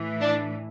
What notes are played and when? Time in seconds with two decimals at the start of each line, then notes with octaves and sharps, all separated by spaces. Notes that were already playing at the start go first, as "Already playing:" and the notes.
Already playing: A2 E3
0.21 D4